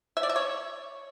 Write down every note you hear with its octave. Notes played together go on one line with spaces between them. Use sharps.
E5
D5
E5
C#5